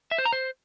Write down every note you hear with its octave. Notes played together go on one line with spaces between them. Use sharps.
E5
C5
A#5
C5